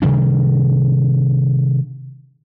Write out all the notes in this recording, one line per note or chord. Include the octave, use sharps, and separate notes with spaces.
C3 D#3 G3 D4